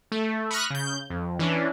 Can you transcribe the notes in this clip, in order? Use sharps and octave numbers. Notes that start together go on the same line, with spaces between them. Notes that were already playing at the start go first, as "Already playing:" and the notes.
A3
B5 C#6 D#6 F6 F#6 A#6
C#3 G6
F2
E3 C#4 D4